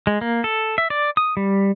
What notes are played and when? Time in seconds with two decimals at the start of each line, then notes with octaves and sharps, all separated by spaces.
0.07 G#3
0.21 A#3
0.44 A4
0.78 E5
0.90 D5
1.17 D#6
1.37 G3